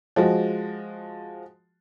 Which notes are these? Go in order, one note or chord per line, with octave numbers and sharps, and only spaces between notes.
F3 G#3 F#4